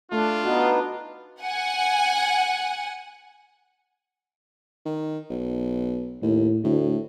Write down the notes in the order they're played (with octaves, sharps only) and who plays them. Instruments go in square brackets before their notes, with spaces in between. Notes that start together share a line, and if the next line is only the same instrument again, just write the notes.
[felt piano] A3 [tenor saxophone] D4 [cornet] F4
[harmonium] B3 D#4 [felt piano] F#4
[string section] F#5 G#5
[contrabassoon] D#3
B1
[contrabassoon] D#2 [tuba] A2
[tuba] D2 [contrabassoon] A2